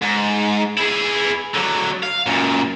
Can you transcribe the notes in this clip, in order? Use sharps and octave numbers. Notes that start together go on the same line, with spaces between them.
G#2
E4 G#4
D3 F#3
F5
F#2 A#2